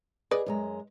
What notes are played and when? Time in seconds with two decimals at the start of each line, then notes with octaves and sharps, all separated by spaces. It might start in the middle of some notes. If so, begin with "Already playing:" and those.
0.31 G#4 B4 D5 D#5
0.46 F#2 G#3 A#5